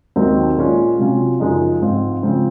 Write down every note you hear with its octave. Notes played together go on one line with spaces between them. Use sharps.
D#2 D#3 F#3 C4 D#4
A#2 G#3 C#4 F4
C3 F#3 C#4 F4
F#2 C#3 F3 G#3 D#4
G#2 F3 C4 F4
C#3 F3 C4